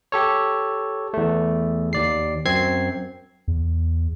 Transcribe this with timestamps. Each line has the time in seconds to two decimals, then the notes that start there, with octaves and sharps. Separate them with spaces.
0.12 G4 A4 C#5
1.14 E2 A3
1.93 D#2 D5 C7
2.45 F#2 C4 G#6 C7
3.48 E2